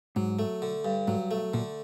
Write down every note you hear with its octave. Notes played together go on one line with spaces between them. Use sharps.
G#2 F#3
A3
D3
G2
G#2 F#3
A3
A#2 D3